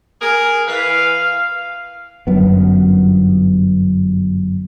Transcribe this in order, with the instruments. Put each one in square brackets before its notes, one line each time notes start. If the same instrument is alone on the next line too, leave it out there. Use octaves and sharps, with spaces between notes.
[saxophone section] G#4 A#4
[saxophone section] E3 B4 [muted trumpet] F5
[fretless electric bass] G1 F#2 B3